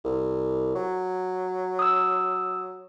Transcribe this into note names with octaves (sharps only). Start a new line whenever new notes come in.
C2
F#3
D#6 E6